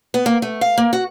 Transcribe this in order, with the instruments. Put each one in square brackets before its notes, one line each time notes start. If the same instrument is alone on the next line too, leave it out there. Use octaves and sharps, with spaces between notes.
[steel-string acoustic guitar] B3
A#3
A3
F5
A#3
F#4